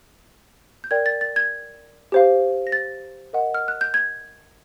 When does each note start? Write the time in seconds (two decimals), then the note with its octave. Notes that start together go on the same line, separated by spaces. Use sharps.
0.84 G6
0.91 A#4 D5 G5 G#6
1.06 A6
1.21 A6
1.36 G#6
2.12 G4 C5 F5
2.67 A#6
2.72 A6
3.33 A#4 D#5 F#5
3.54 F6
3.68 F#6
3.81 G6
3.94 G#6